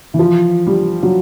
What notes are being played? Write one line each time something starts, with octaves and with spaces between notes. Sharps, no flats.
E3
F3
G3
F#3